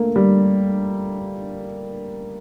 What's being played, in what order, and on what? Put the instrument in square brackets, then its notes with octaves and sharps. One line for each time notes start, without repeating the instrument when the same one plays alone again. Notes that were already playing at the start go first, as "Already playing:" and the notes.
Already playing: [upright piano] A3 A#3
G3